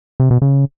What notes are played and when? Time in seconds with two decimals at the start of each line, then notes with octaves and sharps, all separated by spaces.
0.20 C3
0.31 B2
0.42 C#3